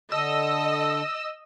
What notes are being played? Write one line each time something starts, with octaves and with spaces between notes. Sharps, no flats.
D3 A4 D#5 E6